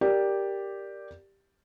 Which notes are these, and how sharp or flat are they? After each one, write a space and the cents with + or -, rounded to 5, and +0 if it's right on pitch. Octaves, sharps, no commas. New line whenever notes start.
G4 +0 A#4 +0 D5 +0